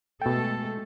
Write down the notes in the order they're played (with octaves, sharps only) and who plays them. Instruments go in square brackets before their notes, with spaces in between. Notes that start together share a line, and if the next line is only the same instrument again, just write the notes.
[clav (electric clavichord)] B2 G5 [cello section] G#3 A3 A4